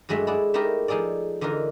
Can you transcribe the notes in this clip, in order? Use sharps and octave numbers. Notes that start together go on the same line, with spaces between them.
G2 F#3 G#3 A3 E5
E4 G#4 D5 F#5
A3 D#4 E4 G4 A#4
F3 D#4 G#4 A4 D5
D3 E3 D#4 F4 A#4